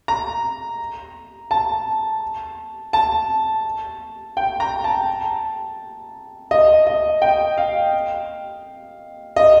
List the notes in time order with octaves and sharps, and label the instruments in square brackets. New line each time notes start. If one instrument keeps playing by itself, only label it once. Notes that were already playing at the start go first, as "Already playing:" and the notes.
[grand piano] A#5
A5
A5
G5
A#5
A5
D#5
D#5
G5
F5
D#5